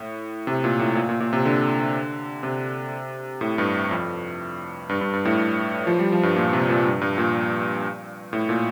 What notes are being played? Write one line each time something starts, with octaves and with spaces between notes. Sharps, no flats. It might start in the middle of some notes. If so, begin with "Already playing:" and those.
Already playing: A2
C3
A#2
A2
A#2
A#2
A#2
C3
D3
C3
A2
G2
F2
G2
G2
G2
A2
G2
F3
G3
F3
G2
A#2
C3
A#2
G2
G2
A#2
A2
A#2